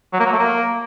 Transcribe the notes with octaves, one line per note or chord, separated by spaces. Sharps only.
F#3
A#3
F#3
A3
A#3